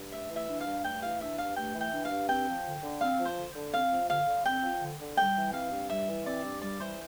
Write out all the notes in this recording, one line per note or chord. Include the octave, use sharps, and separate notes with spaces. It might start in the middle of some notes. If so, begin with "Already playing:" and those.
Already playing: G2
A3 E5
E3
E5
D4
F5
G2
A3 G5
E3 F5
D4 E5
G2 F5
A3 G5
E3
G5
D4
F5
G2
C4 G5
F3
D3
D3
C4 F5
F3
C5
D3
D3
C4 F5
F3
D3 F5
D3
C4 G5
F3
D3
D3
G3 G5
E3
C4 F5
G2
G3 E5
E3
C4 D5
G2
G3 D5
E3 C5